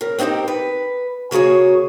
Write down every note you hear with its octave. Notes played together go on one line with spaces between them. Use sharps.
C#3 A#4
B3 C4 D#4 G4 A#4
B4
C#3 A#3 F#4 G#4 C#5